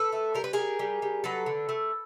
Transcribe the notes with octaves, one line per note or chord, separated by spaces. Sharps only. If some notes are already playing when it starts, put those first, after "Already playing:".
Already playing: A4 B4
A3
G3 A#4
B4
G3 G#4 A#4
G3
G3
F#3 A4 B4
D3
A3